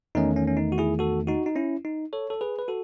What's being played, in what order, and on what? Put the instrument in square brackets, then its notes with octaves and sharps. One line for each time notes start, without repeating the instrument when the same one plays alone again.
[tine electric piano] E2 D#3 A3 C#4 D#4
C#4
C#4
D#4
F#4
E4 G#4
F#4 A4
D#4 F#4
D#4
C#4 E4
D#4
A4 C#5
A4
G#4 B4
B4
F#4 A4